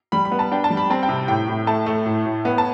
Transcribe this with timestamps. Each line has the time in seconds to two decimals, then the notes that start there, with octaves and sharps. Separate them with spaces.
0.12 G3 B5
0.25 B5
0.32 B3
0.39 A5
0.52 D4 G5
0.64 A5
0.70 G3
0.77 B5
0.90 C4 A5
1.03 G5
1.09 C3
1.28 A2 G5
1.48 A2
1.67 A3 A5
1.86 A3
2.06 A2
2.26 A2
2.45 B3
2.58 A5